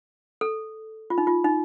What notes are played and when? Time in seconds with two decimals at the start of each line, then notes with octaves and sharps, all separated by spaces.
0.41 A4
1.10 F4
1.18 D#4
1.27 F4
1.45 D#4